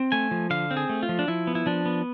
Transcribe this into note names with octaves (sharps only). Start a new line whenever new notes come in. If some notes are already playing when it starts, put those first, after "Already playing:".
Already playing: C4
A3 G#5
F3
D3 F5
C4
G#4
A3
F4
F3
D4
F3 E4
B3
E4
F3 D4
B3